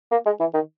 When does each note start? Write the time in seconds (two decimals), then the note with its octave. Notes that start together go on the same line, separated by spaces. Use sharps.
0.11 A#3
0.26 G#3
0.40 E3
0.54 D#3